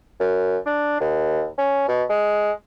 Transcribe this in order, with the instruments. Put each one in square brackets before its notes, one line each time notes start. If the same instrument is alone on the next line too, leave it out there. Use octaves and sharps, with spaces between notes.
[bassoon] F#2
D4
D#2
C#4
B2
G#3